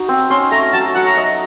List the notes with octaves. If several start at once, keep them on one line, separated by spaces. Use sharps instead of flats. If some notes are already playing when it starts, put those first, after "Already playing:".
Already playing: D#4 F#4
C4
C#4 C6
A3 A#5
F#3 A5
F#3 F#5
A#5
D#5